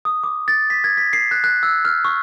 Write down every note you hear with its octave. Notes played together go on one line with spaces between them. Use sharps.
D#6
D6
A6
B6
G#6
B6
C7
F#6
F#6
E6
F6
C#6